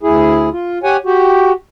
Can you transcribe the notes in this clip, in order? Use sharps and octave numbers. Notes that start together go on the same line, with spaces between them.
D2 E4 G#4
F4
G4 C#5 F#5 G#5
F#4 G4